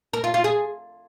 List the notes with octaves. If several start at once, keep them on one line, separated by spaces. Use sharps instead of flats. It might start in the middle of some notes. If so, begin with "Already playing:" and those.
A#4
F4
F4
G#4